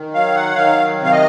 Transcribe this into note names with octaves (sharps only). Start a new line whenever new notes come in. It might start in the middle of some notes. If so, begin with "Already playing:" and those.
Already playing: D#3
F#3 F5
F#5
D#3 F5
C3
F5
D#5